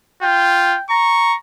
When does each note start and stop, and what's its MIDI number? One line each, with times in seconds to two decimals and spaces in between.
0.23 0.77 65
0.23 0.82 79
0.90 1.34 82
0.90 1.37 85